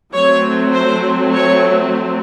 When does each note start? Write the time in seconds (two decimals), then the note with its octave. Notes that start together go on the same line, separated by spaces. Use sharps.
0.14 F#3 A3 C4 C#5
0.73 C5
1.34 C#5